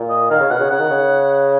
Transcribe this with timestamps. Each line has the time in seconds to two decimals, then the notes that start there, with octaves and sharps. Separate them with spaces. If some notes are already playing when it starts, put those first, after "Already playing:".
Already playing: A#2
0.09 D#5
0.30 D#3 F5
0.40 C#3
0.50 B2 F#5
0.60 C#3
0.71 C#3 F#5
0.80 D#3
0.90 C#3